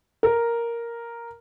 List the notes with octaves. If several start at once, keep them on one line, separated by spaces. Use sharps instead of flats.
A#4